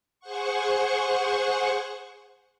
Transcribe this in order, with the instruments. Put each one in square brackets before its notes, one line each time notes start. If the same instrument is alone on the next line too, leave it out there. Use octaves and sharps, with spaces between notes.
[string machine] G#4 C5 F#5 C#6